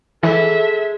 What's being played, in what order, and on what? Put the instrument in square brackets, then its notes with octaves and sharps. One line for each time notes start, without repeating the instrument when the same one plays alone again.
[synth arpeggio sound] E3 [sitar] G#3 [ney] A4 [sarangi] E5